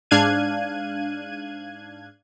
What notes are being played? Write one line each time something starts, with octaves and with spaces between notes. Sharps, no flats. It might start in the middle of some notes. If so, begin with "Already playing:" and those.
G#2 D4 F5 F#6 G#6 D#7